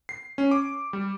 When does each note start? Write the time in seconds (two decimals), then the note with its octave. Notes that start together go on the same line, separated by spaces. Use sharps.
0.09 C7
0.38 C#4
0.51 D6
0.93 G3